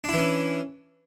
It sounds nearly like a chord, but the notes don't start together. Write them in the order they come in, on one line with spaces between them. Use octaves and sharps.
D4 E4 E3 C#4